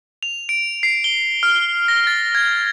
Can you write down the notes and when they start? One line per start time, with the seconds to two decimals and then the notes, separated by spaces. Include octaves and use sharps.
0.23 F7
0.49 D7
0.83 C7
1.04 G7
1.43 F6
1.88 A#6
2.07 A6
2.35 G#6